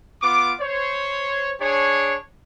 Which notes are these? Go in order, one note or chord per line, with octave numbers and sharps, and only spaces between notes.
B3 F4 D6
C5 C#5
D4 G#4 C#5